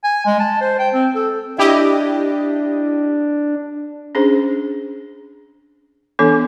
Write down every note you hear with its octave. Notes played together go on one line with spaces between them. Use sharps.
G#5
G#3
A5
C5
G5
C4
A4
D4 E4 G4 D#5
C#4 D4 G#4 C5
E3 B3 D4 A4 D6